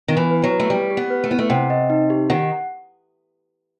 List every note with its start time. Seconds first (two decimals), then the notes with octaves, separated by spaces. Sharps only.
0.08 D#3 B3
0.17 E3
0.31 B4
0.43 F#3
0.51 B4
0.60 A3
0.70 G3 G4
0.90 G4
0.97 B3
1.10 B4
1.24 A3
1.30 B3 E4
1.39 A3
1.50 C3 F#5
1.70 D#5
1.90 D#4
2.10 G4
2.30 D#3 F#5